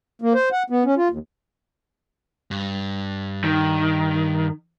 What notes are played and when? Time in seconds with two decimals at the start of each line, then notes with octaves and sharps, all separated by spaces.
0.22 A#3
0.34 C5
0.52 F#5
0.70 B3
0.85 C#4
0.97 F4
1.10 D#2
2.51 G2
3.44 D#3